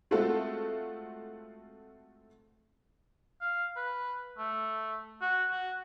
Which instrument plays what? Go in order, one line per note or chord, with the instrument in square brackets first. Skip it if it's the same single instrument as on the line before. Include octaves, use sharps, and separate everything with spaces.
[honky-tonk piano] G#3 A3 C4 F4 F#4 A4
[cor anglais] F5
B4
A3
F#4
F#4